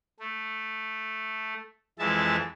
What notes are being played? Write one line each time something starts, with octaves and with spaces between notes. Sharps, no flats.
A3
F2 E3 G#3 E5 A5